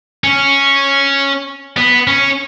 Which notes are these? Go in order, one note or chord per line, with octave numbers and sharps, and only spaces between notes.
C#4
B3
C#4